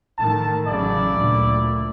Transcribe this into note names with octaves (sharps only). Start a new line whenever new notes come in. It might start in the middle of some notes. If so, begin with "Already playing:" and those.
A2 D#3 A3 A5
A1 C#3 F#3 E4 D5
D2 A#2